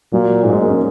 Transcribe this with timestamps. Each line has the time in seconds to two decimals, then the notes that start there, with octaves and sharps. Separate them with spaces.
0.12 A#2 F#3
0.44 G#2
0.53 G#3
0.61 A#3
0.69 C#4